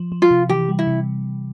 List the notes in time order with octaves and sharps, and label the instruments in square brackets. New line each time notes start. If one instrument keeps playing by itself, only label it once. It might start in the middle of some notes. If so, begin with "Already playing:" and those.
Already playing: [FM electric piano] F3
F3
[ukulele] F4
[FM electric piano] C3
[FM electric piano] E3 [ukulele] G4
[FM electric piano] G3
[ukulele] E4
[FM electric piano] C3